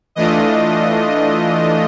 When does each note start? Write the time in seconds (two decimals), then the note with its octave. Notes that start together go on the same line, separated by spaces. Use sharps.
0.15 E3 A3 D4 F4 D#5